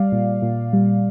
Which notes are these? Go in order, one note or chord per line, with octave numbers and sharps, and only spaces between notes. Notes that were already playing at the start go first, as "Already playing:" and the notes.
Already playing: G3 D5 F5
A#2
A#2
G3